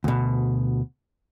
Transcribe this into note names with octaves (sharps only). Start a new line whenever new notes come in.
D2 B2